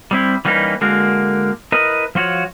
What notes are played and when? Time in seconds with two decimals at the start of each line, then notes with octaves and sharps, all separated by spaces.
0.11 G3 C4 E4
0.45 E3 G3 A#3 C#4 D#4 B4
0.81 D3 G#3 A#3 F#4 A#4
1.72 E4 A#4 B4 D#5
2.15 F3 F4 F#4 C#5